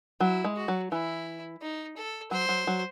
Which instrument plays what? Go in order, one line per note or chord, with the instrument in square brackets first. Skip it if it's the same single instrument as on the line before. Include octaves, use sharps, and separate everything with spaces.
[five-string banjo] F#3 [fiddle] E4
[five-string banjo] G#3
[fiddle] F#4
[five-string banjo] F#3
[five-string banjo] E3 [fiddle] E4
[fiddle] D#4
A4
[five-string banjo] F#3 [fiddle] C5
[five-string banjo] F#3
F#3